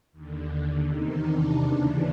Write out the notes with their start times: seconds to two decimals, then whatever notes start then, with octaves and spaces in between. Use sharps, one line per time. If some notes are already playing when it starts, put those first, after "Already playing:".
0.12 D#2
0.18 D3
0.88 E2 C3 D#3 D#4
1.26 D4
1.64 D#2 C#3 E3 D4